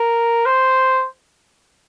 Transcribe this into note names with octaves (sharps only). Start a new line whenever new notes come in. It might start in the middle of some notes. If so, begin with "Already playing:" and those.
Already playing: A#4
C5